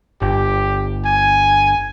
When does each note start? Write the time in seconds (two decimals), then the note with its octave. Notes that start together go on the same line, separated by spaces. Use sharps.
0.22 G1 G4
1.06 G#5